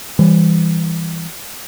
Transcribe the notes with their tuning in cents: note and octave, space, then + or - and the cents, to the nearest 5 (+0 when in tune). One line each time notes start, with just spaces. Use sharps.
E3 +10 G3 +30